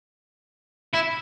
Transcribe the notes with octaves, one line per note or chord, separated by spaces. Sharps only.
E4